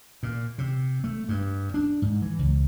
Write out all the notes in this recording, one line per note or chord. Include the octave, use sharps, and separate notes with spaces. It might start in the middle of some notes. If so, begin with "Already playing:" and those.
A#2
C3
A3
G2
D4
G#2
E3
C#2